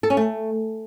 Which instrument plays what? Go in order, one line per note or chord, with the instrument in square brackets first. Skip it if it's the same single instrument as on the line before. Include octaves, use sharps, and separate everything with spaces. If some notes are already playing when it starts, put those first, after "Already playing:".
[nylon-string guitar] A4
C#4
A3